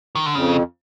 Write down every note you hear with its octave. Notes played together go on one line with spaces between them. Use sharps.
D#3
D3
F2 C#3